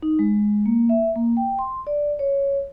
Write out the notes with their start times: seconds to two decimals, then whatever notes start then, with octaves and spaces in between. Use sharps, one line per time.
0.03 D#4
0.19 G#3
0.66 A#3
0.89 E5
1.16 A#3
1.37 G5
1.59 C6
1.87 D5
2.19 C#5